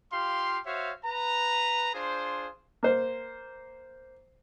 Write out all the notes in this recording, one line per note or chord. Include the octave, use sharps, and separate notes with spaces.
F4 G4 F5 C6
F#4 C5 C#5 E5 F5
B4 A#5
D4 F4 G#4 C5
A#3 C5